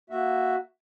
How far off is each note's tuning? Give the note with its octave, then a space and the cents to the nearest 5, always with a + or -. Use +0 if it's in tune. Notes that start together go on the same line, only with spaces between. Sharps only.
A#3 +0 F#4 +0 E5 +0